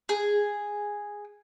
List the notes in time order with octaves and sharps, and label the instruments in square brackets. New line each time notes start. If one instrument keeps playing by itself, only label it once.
[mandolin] G#4